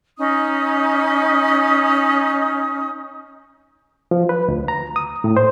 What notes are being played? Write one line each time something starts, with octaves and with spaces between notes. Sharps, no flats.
C#4 D#4 D#6
F3
B4
D2
A#5
D#6
A2
C5